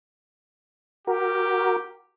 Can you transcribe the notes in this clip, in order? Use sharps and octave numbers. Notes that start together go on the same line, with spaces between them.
F#4 G4 A#4